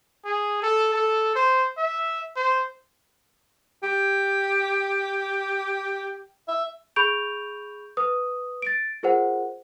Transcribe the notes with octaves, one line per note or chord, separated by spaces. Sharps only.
G#4
A4
A4
C5
E5
C5
G4
E5
G#4 B5 C#6 G6 D7 F7
B4 D#6
A6 D7
F4 G#4 A#4 C5 F#5